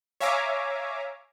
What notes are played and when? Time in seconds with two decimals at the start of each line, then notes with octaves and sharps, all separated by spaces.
0.20 C#5 E5 F5 G#5 A#5 D6